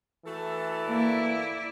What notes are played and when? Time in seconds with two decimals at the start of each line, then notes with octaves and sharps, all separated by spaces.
0.25 E3 A3 F#4 A4
0.88 A#3 E4 D5